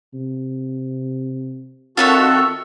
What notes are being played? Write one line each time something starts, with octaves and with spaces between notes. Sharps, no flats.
C3
D#3 C4 F4 F#4 A4 C#5 E5